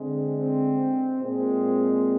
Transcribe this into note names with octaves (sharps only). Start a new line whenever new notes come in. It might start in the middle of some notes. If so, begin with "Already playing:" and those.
Already playing: D3 G#3 C4
C4
A#2 G#3 C4